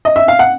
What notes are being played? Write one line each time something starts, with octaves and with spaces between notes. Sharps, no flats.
D#5
E5
F5
F#5